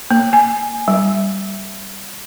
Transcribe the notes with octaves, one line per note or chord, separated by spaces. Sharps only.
A#3
G#5
G3